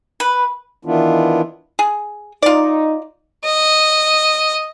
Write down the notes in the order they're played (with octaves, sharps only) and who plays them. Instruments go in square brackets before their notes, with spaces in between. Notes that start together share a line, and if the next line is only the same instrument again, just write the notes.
[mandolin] B4
[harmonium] D#3 E3 B3 D4 E4 F4
[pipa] G#4
[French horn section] D#4 [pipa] F4 D5
[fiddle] D#5